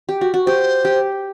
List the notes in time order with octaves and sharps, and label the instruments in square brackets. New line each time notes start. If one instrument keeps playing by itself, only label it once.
[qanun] G4
F#4
F#4
[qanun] G4 [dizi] C5
[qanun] G4